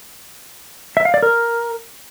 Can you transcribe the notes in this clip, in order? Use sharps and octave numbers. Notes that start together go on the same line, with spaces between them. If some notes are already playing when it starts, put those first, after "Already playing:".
E5
F5
D5
A#4